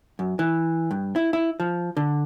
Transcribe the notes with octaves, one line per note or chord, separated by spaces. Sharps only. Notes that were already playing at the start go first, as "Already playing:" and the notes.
F#2
E3
G2
E4
E4
F3
D3